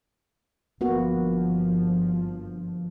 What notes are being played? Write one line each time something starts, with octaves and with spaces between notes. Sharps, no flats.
G1 G2 F3 A#3 B3 F#4